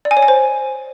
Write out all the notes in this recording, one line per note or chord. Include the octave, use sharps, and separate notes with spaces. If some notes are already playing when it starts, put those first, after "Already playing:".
D5
G#5
C#5
G#5
C5